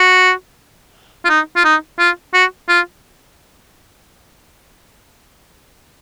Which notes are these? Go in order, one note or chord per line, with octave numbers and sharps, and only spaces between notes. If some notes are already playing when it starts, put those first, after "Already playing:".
Already playing: F#4
F4
D#4
F4
D#4
F4
F#4
F4